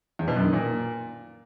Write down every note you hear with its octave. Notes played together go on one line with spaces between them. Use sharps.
E2
B2
F#2
D#3
A#2